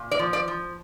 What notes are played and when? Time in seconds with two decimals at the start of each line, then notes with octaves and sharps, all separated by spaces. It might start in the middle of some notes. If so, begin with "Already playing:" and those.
Already playing: A#2
0.11 D5
0.19 F3
0.33 D5
0.48 F3